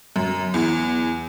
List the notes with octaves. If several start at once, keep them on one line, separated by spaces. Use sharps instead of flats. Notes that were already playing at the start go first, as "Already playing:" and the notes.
F#2
E2